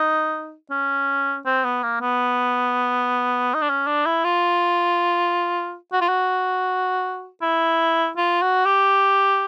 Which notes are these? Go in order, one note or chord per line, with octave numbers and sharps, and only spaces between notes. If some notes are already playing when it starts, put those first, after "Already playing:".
Already playing: D#4
C#4
C4
B3
A#3
B3
D#4
D4
C#4
D4
E4
F4
F#4
F4
F#4
E4
F4
F#4
G4